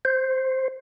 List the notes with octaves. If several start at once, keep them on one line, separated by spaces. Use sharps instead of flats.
C5